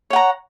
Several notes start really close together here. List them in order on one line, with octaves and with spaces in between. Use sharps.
C#5 F#5 A#5